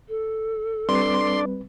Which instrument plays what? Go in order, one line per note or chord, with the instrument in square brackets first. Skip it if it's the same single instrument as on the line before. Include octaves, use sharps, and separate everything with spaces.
[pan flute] A4
[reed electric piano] G3 C4 B4 [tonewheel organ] D4 D5 [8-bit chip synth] C6